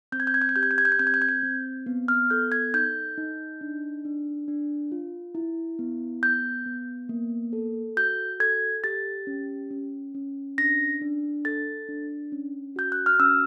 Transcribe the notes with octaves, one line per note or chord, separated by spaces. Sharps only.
C4 G6
G#6
G6
G#6
G6
G#6
G4 G6
G#6
G6
G#6
G6
G#6
C4 G6
G#6
G6
G#6
G6
C4
B3
F6
A4 G6
G#6
D#4 G6
D#4
D4
D4
D4
F4
E4
B3
B3 G6
B3
A#3
A4
F#4 G6
A4 G#6
G4 A6
C#4
C#4
C#4
D4 A#6
D4
A4 A6
D4
C#4
F#4 G6
F#6
F6
C#4 E6